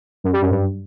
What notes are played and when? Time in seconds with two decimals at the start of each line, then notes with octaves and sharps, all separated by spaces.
0.24 F#2
0.33 G3
0.42 F#2
0.51 G2